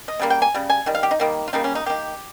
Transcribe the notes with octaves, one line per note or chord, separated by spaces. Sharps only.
D#5
C#3 G3 A#3
G5
G#5
C#3 G3
G#5
D#3 G3
F5
G4
D#4
D#3 G3 A#3
F4
C#3 G3 A#3 D#4
C#4
D#4
D#3 A#3 G4